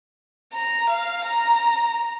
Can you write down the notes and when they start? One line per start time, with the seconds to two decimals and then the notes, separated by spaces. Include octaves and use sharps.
0.53 A#5
0.90 F5
1.25 A#5